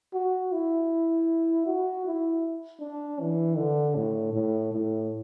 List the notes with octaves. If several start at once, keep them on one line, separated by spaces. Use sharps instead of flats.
F#4
E4
F#4
E4
D4
E3
D3
A2
A2
A2